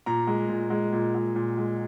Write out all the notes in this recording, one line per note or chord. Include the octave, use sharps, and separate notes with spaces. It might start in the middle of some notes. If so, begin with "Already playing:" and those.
A#2 A#5
G#3
A#2
G#3
A#2
G#3
A#2
G#3